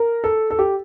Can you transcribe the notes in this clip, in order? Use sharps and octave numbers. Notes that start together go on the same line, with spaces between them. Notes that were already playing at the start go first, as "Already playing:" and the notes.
Already playing: A#4
A4
A4
G4